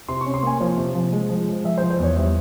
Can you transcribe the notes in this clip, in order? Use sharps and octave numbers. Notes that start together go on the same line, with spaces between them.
C3 C6
C#6
C#4
C6
A#3 G#5
F3 C#5
C3
F3
G#3
F3
G#3
F3 E5
C5
F3
C5
E2 C#5
G3 E5